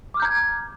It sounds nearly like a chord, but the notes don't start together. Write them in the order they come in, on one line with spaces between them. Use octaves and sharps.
D6 F6 G6 A#5 G#6